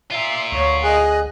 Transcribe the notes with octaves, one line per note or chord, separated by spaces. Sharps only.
F4 A#4 E5 C6
D2 C#5 C#6
G#4 D#5 F#6